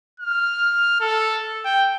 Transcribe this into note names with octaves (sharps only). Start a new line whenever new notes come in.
F6
A4
G5